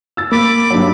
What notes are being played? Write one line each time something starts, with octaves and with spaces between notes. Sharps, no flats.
E6 A6
A#3 B5 D6
G2 F#3